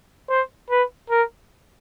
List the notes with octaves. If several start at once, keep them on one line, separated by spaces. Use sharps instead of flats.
C5
B4
A#4